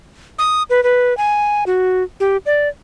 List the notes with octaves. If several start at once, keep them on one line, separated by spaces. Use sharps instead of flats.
D#6
B4
B4
G#5
F#4
G4
D5